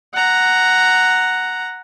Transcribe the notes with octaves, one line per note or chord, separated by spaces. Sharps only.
F#5 A#5